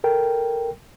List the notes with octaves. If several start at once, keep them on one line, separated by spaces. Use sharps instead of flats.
A4 A#4 G5